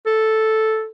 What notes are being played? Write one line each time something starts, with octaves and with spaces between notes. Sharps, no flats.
A4